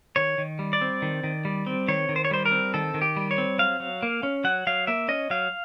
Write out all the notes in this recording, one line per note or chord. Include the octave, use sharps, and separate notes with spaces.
D#3 C#5
D#3
G3
D5
C4
D#3
D#3
G3
C4
D#3 C#5
D#3
C5
C#5
G3 C5
A#4
C4
D#3 A4
D#3
G4
G3
C#5
C4
F#3 F5
F#3
A#3
C#4
F#3 F#5
F#3 F5
A#3 E5
C#4 D#5
F#3 F5